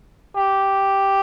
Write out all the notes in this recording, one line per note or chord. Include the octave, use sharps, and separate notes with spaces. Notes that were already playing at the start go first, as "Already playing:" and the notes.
G4